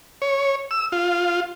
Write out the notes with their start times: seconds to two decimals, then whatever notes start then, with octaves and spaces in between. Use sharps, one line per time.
0.22 C#5
0.71 E6
0.92 F4